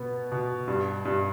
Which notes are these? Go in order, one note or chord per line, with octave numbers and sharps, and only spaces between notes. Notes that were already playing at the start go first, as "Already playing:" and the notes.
Already playing: B2 B3
B2
G2
G2